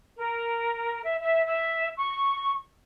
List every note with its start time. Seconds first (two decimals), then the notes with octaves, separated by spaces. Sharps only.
0.17 A#4
1.04 E5
1.20 E5
1.46 E5
1.98 C#6